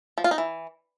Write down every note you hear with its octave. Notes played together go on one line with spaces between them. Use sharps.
F3
F4
D#4
E3